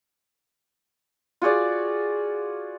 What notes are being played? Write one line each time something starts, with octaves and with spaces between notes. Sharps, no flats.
F4 F#4 G#4 D5